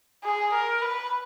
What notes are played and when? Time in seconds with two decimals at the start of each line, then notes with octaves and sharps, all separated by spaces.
0.24 G#4
0.53 A#4
0.82 B4